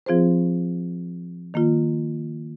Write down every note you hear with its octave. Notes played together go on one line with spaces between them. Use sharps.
F3 C4 F4 G#4 C5
D#3 A#3 F4